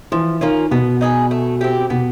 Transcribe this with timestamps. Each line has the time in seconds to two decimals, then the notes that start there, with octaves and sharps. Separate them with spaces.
0.12 E3 F3
0.41 D#3 A#3 C#4 F4
0.71 B2 B3
1.01 D#4 G#4 B4
1.31 A3
1.61 C4 E4 G4
1.90 B2 B3